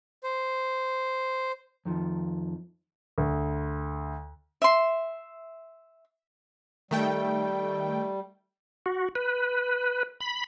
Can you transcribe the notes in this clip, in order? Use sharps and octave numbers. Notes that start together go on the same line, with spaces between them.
C5
F2 D#3 F3
D2
E5 C6
D#3 G3 A3 G5
F#4
B4
B5